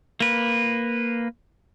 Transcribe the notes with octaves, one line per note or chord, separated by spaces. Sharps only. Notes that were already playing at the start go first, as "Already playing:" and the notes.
A#3 B4